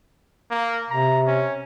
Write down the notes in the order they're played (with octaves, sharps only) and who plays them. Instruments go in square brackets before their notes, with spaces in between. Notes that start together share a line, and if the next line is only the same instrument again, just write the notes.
[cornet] A#3
[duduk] C3 [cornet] A#5
[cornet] C#4